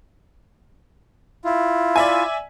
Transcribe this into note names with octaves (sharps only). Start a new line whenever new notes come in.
E4 F4
D5 E5 G#5